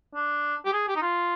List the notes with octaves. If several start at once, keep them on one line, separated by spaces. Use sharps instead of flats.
D4
G4
G#4
G4
D#4
F4